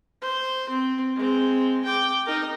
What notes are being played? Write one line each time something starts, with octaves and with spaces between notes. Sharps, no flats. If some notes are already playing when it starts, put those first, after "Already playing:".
C5
C4
G#3 C4
G5 D6
D#4 A#4